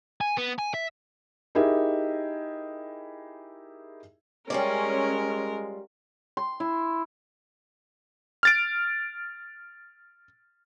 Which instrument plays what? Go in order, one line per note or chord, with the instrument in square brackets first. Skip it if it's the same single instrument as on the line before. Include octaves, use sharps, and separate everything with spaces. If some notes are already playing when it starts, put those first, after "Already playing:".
[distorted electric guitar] G#5
B3
G#5
E5
[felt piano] D#4 E4 G4 G#4 A#4 E5
[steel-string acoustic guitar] G3 F4 D5 [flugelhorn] G#3 [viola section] C#4 [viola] A#4
[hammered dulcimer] C6
E4
[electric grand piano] F6 A6 D7